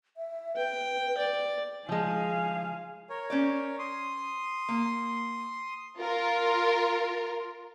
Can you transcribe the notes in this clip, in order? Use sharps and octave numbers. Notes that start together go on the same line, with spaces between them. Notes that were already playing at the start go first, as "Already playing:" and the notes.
E5
B4 G5
D5
F3 G#3 F5 G#5
A#4 C#5
C#4 C5 D5
C6 D#6
A#3
F4 A#4